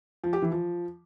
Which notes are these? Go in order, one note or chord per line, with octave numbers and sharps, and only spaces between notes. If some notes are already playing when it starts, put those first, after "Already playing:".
F3
G4
E3
F3